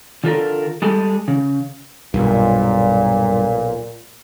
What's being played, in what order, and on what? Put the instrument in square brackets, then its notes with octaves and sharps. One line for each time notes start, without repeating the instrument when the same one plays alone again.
[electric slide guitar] D3 F4 A4 A#4
G3 G#3 G#4 A4
C#3
[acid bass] B1 [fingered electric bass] G2 [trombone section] A#2